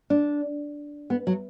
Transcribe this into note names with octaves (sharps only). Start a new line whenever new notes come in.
D4
B3
F#3